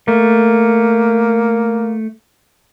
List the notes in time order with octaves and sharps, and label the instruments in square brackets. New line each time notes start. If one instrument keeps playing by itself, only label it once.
[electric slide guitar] A3 [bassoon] A#3